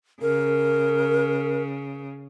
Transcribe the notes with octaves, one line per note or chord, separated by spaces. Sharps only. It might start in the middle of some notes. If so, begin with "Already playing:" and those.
C#3 A#4